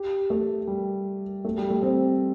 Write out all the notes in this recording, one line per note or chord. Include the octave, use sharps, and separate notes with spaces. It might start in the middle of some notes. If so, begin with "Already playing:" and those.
Already playing: G4
A3
G3
A3
G3
A3
C4